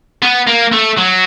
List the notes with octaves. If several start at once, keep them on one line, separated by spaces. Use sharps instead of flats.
B3
A#3
A3
F#3